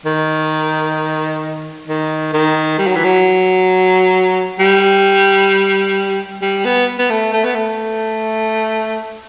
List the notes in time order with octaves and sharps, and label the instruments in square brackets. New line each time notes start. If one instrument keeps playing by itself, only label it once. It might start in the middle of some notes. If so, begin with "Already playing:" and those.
[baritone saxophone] D#3
D#3
D#3
G3
F#3
E3
F#3
G3
G3
B3
B3
A3
A3
B3
A3